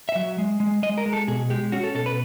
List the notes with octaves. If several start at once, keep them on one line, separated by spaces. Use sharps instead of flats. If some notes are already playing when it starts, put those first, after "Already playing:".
E5
F#3
G#3
G#3
G#3 D#5
A#4
G#3
A4
B2 G#4
G#3 G4
C#4 F#4
A4
B2 A4
B4